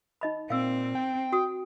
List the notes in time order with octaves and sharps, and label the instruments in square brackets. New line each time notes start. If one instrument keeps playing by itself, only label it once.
[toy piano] D#4 D#5 B5
[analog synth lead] A#2 [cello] C4 [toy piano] F5 E6
[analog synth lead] G5
[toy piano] F#4 D#6